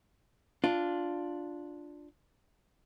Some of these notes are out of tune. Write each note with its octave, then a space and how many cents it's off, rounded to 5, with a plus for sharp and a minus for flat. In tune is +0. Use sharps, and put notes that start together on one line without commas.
D4 +0 F4 +0